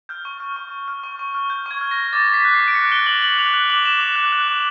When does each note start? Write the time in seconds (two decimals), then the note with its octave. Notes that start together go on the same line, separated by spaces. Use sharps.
0.09 F6 G6
0.25 C#6
0.40 F6
0.56 C#6
0.72 C#6
0.88 F6
1.04 C#6
1.19 C#6
1.34 F6
1.50 F6 G6
1.66 C#6 G#6
1.81 F6
1.91 A#6
1.97 F6
2.13 D6 A6
2.28 D6
2.34 B6
2.44 F#6
2.54 C7
2.60 D6
2.68 D7
2.75 F#6 C#7
2.91 F#6 G7
3.06 D6 F#7
3.22 D6 F#7
3.38 F#6 F7
3.54 F#6 F#7
3.70 D6 F#7
3.85 D6 E7
4.00 D6 F7
4.16 F#6
4.32 F#6
4.48 D6